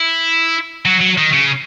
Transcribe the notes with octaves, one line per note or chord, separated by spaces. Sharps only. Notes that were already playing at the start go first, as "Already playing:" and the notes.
Already playing: E4
F#3
F#3
D#3
C#3